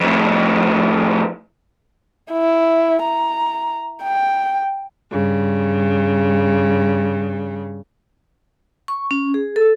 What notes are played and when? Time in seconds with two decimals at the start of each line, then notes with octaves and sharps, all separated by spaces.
0.01 F2 A2
2.31 E4
3.02 A#5
4.03 G5
5.12 G2 C#3
8.88 C#6
9.11 C#4
9.34 G#4
9.56 A4